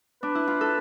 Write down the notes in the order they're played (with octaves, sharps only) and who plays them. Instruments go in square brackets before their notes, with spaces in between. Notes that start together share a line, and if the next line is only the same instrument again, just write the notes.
[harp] D4 [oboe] B4
[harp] E4
F4
A4